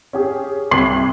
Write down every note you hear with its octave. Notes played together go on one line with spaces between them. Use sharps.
C#4 G4 G#4
C2 C6 G#6 C7 F#7